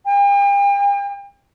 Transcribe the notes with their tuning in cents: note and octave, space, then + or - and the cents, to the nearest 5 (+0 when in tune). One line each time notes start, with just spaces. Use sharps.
G5 +45